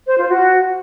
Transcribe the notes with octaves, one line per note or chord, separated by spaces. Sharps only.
C5
F4
F#4